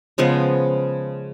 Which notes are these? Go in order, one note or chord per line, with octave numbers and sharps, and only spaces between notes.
C#3 F3 G#3 B3